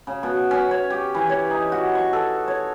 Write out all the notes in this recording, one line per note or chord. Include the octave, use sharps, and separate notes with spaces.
C#3
B2
C#4
C#5
G4
E3
C#5
D#4
F#4
C#6
A4
C#5